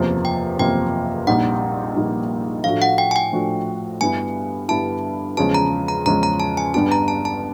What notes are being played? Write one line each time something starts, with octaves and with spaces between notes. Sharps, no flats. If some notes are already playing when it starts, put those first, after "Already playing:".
Already playing: F#1 E2 C3 F3 A#3
G5
F#1 E2 C3 F3 A#3 G5
A#1 A#2 G3 A#3 D#4 F#5
A#1 A#2 G3 A#3 D#4
A2 F3 A3 D4 F#4 F5
F#5
G5
G#5
G5
A2 F3 A3 D4 F#4
G2 D3 G3 B3 E4 G#5
G2 D3 G3 B3 E4 A5
E2 C#3 F3 G#3 C#4 A5
A#5
A#5
E2 C#3 F3 G#3 C#4 A#5
A#5
A5
G#5
G1 G2 D3 G3 B3 A5
A#5
A5
A5